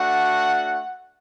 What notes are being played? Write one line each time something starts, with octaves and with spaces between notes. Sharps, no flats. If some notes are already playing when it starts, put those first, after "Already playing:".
Already playing: A3 D4 F#4 F#5